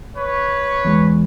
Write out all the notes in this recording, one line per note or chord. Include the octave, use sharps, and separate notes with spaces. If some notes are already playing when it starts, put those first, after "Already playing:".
B4 C#5
E2 G#3